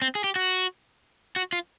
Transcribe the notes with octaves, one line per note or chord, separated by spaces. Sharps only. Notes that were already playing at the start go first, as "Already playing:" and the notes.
C4
G#4
G4
F#4
F#4
F4